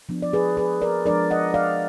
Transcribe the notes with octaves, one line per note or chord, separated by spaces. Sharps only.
F3 B3 D4
D5
G#4 B4
G#4 B4
A#4 D5
F3 G#3 D4 A#4 D5
D#5 F#5
D5 F5